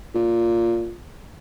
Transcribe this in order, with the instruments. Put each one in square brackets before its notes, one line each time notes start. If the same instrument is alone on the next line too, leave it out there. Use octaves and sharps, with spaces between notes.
[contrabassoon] A#2